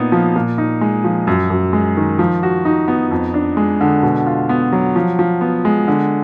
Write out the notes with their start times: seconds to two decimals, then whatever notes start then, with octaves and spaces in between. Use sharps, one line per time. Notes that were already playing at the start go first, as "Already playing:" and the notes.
Already playing: A#2 B3 D#4
0.12 F3
0.36 A#2
0.58 D#4
0.81 G#3
1.04 F3
1.27 F#2
1.50 F#2
1.73 G#3
1.97 D#3
2.19 F3
2.43 F#4
2.65 D#4
2.88 B3
3.11 F2
3.34 D4
3.57 G#3
3.81 D3
4.03 B2
4.26 F4
4.49 B3
4.73 F#3
4.96 F3
5.19 F3
5.41 B3
5.65 G#3
5.88 D3